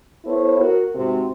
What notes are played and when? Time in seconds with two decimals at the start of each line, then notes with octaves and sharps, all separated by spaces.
0.25 B3 E4 A4 C5 C#5
0.59 F#4 A#4
0.95 G#2 C3 F#4 C5